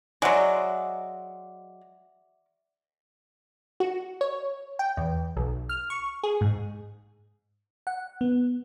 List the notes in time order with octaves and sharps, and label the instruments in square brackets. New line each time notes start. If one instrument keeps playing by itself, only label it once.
[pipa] F#3 G#3 [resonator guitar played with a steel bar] D5 [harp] E5 F#5 C6
[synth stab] F#4
C#5
G5
E2
B1
F6
C#6
G#4
G#2
[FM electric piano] F#5
B3